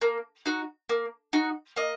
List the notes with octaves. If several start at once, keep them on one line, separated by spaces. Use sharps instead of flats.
A#3
D#4 F#4
A#3
D#4 F#4
A#3 D#5